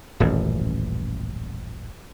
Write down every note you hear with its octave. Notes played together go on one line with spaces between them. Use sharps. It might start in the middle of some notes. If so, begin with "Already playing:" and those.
D#1 A1 F#2